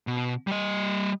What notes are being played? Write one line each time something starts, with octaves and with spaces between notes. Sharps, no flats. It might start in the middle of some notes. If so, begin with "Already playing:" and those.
B2
G3 D#5